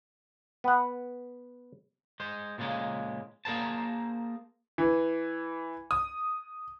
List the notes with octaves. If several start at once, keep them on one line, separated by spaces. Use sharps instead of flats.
B3 F#5
G#3 C5
A#2 C#3 F3 G#3 A#3
A#3 G#4 A#4 C5 A5
E3
D#6